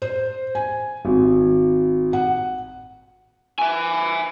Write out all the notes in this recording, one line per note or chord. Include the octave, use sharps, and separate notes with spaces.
C5
G#5
G#1
F#5
E5 G#5